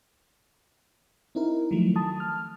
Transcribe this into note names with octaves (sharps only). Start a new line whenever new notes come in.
C4 D#4 E4 A#4
D#3 F3 F#3 A3
A5 D#6
F6